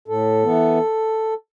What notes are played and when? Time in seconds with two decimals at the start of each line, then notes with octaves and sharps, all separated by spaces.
0.08 A2 A4
0.43 E3 B3